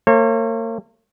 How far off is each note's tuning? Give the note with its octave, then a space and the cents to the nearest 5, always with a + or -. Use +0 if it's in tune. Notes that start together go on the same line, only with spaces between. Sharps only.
A#3 -45 C#5 -40